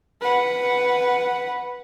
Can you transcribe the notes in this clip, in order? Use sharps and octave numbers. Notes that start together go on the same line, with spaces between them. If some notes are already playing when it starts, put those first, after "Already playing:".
B4 F#5